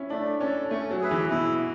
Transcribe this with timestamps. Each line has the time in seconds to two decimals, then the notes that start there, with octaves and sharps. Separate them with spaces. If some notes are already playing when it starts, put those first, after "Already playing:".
Already playing: C#4 E4
0.10 A3 D4
0.41 C#4 D4 A4
0.71 A3 C#4
0.91 F#3
1.01 G#4 B4 E5
1.11 E3
1.31 B2 E4